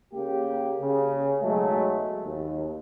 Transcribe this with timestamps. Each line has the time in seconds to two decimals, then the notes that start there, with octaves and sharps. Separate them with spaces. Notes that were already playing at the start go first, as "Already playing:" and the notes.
0.13 C#3 A#3 G4
0.81 C#3
1.43 B1 F#3 G#3 A3
2.24 D#2